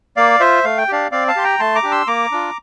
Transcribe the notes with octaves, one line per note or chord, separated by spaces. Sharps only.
A#3 D5 F5
F4 C5 E5
A3 F5
G5
D4 G4 D5 F5
C4 D5 F5
F5 A5
G4 C6
G5 A#5
A3 A5 C6
A#5 D6
D4 G4
C6 E6
A#3 A#5 D6
D4 F4